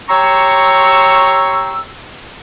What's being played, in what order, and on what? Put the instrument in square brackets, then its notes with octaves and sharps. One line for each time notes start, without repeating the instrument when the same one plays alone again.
[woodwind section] G4 C#5 A#5 C6 C#6 E6